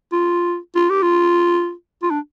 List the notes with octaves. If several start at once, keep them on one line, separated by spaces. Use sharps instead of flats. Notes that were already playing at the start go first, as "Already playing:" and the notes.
F4
F4
G4
F4
F4
D4